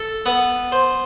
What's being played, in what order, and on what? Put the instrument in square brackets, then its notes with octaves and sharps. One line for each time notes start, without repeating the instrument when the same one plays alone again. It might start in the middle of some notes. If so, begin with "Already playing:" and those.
Already playing: [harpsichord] A4
B3
C5